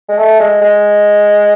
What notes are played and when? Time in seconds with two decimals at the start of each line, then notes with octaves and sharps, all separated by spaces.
0.08 G#3
0.18 A3
0.40 G#3
0.61 G#3